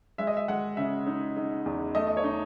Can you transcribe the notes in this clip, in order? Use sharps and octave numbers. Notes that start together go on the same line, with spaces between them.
G#3 E5
D#5
E5
G#3 F#5
C#3 E5
D#4
D#4
E2
A3 D#5
D#5
C#5
D#4